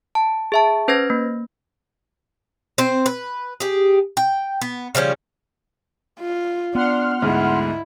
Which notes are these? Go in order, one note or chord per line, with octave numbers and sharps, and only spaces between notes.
A5
G#4 E5 A5
C#4 B4 C5 G#6 A#6
A#3
C4 C5
B4
G4 G#4
G5
B3
C#3 F3 G3 C#4
F4
B3 D4 F#5 C6 F6
D2 G#2 E4